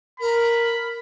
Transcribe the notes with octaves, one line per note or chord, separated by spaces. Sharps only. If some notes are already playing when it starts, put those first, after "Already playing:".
A#4 B5